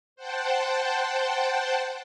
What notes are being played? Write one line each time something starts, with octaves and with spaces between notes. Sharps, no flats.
C5 F#5 G5 A5